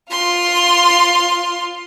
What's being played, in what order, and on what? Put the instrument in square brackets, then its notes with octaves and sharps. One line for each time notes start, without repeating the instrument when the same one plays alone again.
[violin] F4 C6